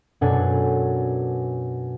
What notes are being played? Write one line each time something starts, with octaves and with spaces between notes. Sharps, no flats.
F#2 B2 D4 A4 F#5 G#5